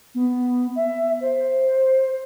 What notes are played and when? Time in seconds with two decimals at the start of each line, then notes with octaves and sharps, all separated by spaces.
0.15 B3
0.76 E5
1.21 C5